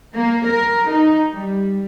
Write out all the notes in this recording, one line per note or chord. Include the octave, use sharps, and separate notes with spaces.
A#3
A#4
D#4
G3